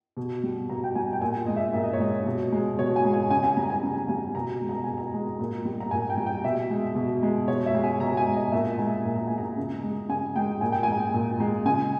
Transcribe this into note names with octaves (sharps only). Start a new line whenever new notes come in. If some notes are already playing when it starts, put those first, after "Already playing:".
B2
G3
B2 A#5
G5
G3 G#5
G5
A#2 G#5
G#3 D#5
E5
A#2 E5
D#5
C#5
G#3 D#5
B2
G#3
B2 C#5
G#5
G#3
G#5
C#3 G#5
G#5
G3 A#5
G#5
C#3
G3 G#5
B2 A#5
G#3
A#5
B2 G#5
A#5
G#3
A#2
G3
A#5
A#2 G#5
G5
G3
G5
B2 E5
G#3
B2
G#3
B2 C#5
E5
G#3
G#5
B2 A#5
G#5
G#3
D#5
A#2 E5
G#3 G#5
A#2
A#5
G#3 G#5
A#5
C#3
G#3
C#3 G#5
G#3 G5
A#2 G#5
G5
G#3 G#5
A#2
G#3
C#3 G#5